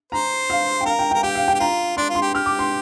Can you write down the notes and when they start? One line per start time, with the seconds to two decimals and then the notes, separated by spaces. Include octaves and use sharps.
0.12 C5 A#5
0.50 F5
0.81 G5
0.86 A#4 F5
0.99 G5
1.11 G5
1.14 A#4
1.23 G4 G5
1.35 F5
1.48 G5
1.55 G4
1.60 F4 A#5
1.97 D4 C6
2.09 F4
2.15 C6
2.22 G4
2.34 G4 F6
2.46 D6
2.59 C6